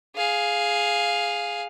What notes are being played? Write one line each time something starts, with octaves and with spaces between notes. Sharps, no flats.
G#4 F5